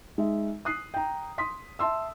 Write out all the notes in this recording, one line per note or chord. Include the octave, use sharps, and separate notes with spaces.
G#3 D#4 E5
D#6 F#6 C7
G5 A#5
C6 D#6 B6
E5 A5 C6 E6